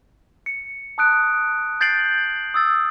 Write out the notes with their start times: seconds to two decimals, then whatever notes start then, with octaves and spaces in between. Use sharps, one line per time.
0.46 C#7
0.98 A5 D#6 F#6 D7
1.81 G6 A6 C7 D7 F#7
2.54 D#6 E6 A6